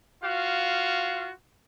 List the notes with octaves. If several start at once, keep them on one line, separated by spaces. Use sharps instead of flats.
F4 F#4 F5